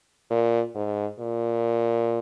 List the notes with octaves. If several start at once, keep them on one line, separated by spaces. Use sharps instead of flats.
A#2
G#2
A#2